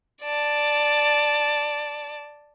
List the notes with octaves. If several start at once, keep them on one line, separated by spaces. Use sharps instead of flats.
D5 A5